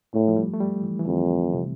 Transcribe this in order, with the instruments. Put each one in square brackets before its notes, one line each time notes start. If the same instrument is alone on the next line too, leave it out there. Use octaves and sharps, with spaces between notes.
[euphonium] A2 [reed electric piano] A3
[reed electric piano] F3
G3
A3
G3
E3
E3
[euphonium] F2 [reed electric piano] D3
[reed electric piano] C3